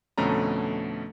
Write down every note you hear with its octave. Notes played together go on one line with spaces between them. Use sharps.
F2 B2 D3 A3 C#4 A#5